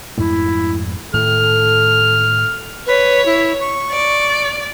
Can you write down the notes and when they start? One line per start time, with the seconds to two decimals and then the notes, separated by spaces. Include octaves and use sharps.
0.18 F2 G#2 A3 E4
1.14 A2 D#3 A4 F6
2.87 B4 C#5
3.26 E4
3.60 C#6
3.91 D5